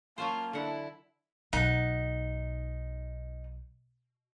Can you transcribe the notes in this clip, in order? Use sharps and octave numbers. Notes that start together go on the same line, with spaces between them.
F#3 A#3 C#4 F4 C5 A5
D3 E4 F#5
B1 D#4 F#5